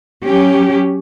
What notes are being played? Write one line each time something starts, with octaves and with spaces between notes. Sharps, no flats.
F#3 C#4 G4